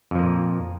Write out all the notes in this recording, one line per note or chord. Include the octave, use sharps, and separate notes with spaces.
F2 A#2 F3 A#3